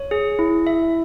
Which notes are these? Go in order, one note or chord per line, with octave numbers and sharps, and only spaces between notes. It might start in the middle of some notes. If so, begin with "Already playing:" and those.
Already playing: C#5
G#4
E4
E5